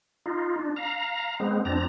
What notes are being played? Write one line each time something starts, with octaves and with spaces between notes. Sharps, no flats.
D#4 F4
D4
F5 A#5
G#3 B3 C4
F2 C4 D4 A#5